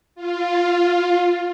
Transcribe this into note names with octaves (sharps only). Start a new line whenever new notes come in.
F4